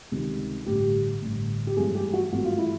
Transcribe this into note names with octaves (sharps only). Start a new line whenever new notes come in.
C#2 C3 D#3 G3
A1 G2 D3 G4
A1 G2 D3
G4
G#1 G2 E3 A3 G#4
G4
F#4
G#1 G2 E3 A3 F#4
F4
E4